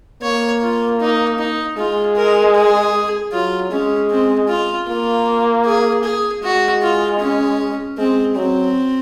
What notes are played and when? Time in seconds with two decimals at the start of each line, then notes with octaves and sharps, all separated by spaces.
0.22 A#3 C#5
0.62 F4
1.00 D#4
1.39 D#4
1.77 G#3 F4
2.16 A#4
2.55 G#4
3.33 F#3 F4
3.71 G#3 C#4
4.10 C4
4.49 F4
4.88 A#3 F4
5.66 G#4
6.04 G#4
6.42 G#3 F#4
6.82 F4
7.20 C#4
7.98 G#3 C4
8.36 F#3 C4